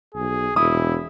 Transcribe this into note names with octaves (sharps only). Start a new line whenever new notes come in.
B1 G#4
E1 E4 D#6